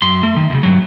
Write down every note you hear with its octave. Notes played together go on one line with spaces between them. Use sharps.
F#2 C6
A3
D#3
D2 C#3
G2 F#3